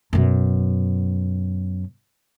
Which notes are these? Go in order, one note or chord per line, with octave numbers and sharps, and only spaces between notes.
F#2 B2